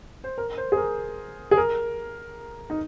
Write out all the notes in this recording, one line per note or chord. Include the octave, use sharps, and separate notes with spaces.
C5
A#4
C5
G#4
A#4
G#4
A#4
D#4